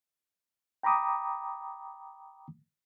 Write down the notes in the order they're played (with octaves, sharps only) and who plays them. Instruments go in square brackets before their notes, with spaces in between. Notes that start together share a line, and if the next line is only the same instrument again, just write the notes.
[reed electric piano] G5 A#5 B5 D6 D#6